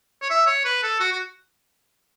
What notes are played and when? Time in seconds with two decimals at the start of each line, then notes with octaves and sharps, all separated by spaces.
0.22 C#5
0.30 E5
0.47 C#5
0.65 B4
0.83 A4
1.00 F#4
1.12 F#4